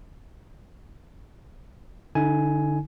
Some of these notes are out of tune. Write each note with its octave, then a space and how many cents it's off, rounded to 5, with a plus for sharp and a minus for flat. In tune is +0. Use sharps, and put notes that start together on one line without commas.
D3 +0 D#4 +35 G#5 +10